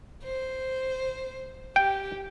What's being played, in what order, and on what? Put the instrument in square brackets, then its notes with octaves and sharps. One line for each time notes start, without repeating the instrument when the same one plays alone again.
[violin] C5
[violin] G4 [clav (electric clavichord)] G5